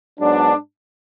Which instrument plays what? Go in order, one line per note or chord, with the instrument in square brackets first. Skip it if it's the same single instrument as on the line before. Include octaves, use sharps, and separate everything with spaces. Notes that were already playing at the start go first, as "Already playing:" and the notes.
[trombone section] G#2 F#3 B3 D4